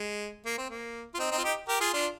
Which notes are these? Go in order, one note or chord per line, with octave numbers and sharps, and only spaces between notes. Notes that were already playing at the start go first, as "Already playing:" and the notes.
Already playing: G#3
A#3
C4
A#3
F4
C4 D#4
C4 D#4
F4
D#4 G4
G4 A#4
F4 G#4
D4 F4